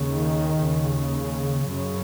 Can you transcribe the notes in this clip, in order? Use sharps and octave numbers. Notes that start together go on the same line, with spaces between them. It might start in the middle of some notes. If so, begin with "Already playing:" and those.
Already playing: D#2 C#3
D#3
D#2 C#3
F#2 C#3